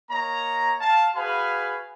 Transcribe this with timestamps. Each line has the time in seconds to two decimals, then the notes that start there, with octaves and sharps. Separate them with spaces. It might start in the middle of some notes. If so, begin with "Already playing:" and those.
0.10 A#3 C#5 D#5 A#5
0.81 F5 A5
1.16 F#4 G#4 B4 F5 G#5 B5